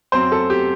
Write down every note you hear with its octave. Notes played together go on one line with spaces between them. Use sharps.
F#2 F#3 C4 C5
A4
G4